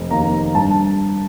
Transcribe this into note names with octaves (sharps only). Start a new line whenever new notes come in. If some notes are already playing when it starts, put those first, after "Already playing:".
Already playing: F1
D#2 D#3 A#3 A#5
G2 A5